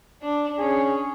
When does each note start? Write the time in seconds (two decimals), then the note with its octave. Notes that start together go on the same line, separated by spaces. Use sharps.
0.22 D4
0.58 C#4 G#4